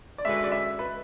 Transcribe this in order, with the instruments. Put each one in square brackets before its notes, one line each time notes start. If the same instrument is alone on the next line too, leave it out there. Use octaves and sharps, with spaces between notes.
[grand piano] D5
[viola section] D3 G#3 C#4 F#4 B4 [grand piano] E5
[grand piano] D5
E5
B4